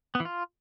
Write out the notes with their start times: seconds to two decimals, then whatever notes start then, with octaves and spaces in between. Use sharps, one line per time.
0.15 B3
0.20 E3
0.25 F4